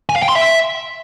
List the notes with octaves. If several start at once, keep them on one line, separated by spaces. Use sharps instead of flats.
G#5
F5
G5
C6
E5